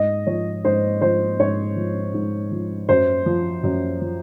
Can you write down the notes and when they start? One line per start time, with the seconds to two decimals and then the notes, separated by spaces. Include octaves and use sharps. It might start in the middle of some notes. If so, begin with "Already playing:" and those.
Already playing: G#2 D#5
0.27 F3 C#5
0.64 G#2 C5
1.01 F3 C5
1.39 G#2 C#5
1.76 F3
2.14 G#2
2.51 F3
2.89 F#2 C5
3.26 F3
3.63 F#2
4.01 F3